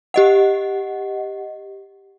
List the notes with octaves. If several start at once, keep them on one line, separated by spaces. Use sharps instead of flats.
G4 D#5 F#5